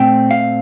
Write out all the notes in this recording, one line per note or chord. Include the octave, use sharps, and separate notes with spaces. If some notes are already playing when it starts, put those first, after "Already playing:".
Already playing: A#2 A3 C4 G5
F5